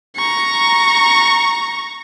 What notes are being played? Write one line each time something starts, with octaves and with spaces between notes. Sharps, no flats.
A#5 C#6